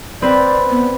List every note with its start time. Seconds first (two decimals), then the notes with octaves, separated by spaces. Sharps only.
0.22 C4 B4 D5
0.70 B3